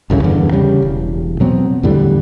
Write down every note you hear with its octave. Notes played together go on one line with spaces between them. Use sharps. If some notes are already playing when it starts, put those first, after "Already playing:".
G1 C2 F#2 C#3
E2 G2 D3
C#3 G3
E1
B2 F#3 B3 C4
E2 A2 D3 G3